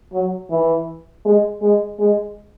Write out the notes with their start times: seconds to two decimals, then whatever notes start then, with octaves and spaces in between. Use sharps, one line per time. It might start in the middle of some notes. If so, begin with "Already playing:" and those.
0.13 F#3
0.50 E3
1.25 G#3
1.62 G#3
2.00 G#3